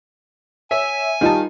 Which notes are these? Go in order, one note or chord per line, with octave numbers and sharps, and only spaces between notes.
C#5 E5 G#5
D#3 G3 D#4 F4 A5